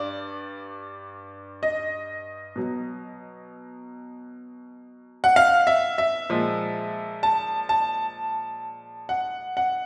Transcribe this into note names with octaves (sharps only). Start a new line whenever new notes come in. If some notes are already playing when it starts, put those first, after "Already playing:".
Already playing: G2 D5
D#5
B2 F#3
F#5
F5
E5
E5
A#2 F3 G#3
A5
A5
F#5
F#5